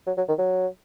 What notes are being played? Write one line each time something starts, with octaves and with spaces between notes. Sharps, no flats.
F#3
F#3
D#3
F#3